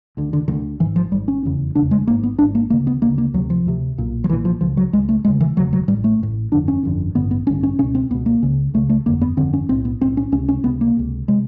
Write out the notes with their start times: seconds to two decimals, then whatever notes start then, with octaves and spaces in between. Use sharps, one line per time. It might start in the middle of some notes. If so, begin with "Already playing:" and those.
0.17 D2 D3
0.33 D3
0.48 D2 D3 D#3
0.80 G#1 G#2 E3
0.96 F3
1.12 G#1 G#2 G3
1.28 C#4
1.43 F1 E2 C#3
1.75 F1 E2 C#3 D4
1.91 G#3
2.07 G#1 G#2 A#3
2.23 B3
2.39 G#1 G#2 D4
2.55 A#3
2.70 D2 C#3 A#3
2.87 B3
3.02 D2 C#3 A#3
3.18 A#3
3.34 D2 F#3
3.38 C3
3.50 F3
3.65 D2 C3
3.98 B1 A#2
4.24 F3
4.29 B1 E3
4.33 A#2
4.45 F3
4.61 C#2 C#3 F3
4.77 F#3
4.93 C#2 G#3
4.97 C#3
5.09 A3
5.24 E1 D2 C#3 G#3
5.41 E3
5.57 E1 D2 C#3 F#3
5.73 F#3
5.88 A1 A2 G3
6.04 A3
6.20 A1 A2
6.52 G1 F2 D3 D4
6.68 C#4
6.84 G1 F2 D3
7.15 A1 G2 D3 B3
7.31 B3
7.47 A1 G2 D3 C#4
7.63 C#4
7.79 B2 C#4
7.82 C#2
7.95 C4
8.10 C#2 B3
8.14 B2
8.26 A#3
8.43 C#2 C#3
8.74 C#2 C#3 A3
8.89 A3
9.06 G1 F2 D3 A#3
9.21 B3
9.37 G1 F2 D3 C4
9.53 C#4
9.69 B1 A2 C4
9.85 B3
10.01 B1 A2 C4
10.17 C#4
10.32 C#2 C3 C#4
10.49 C#4
10.64 C#2 C3 B3
10.81 A#3
10.97 C#2 C3
11.28 C3 G#3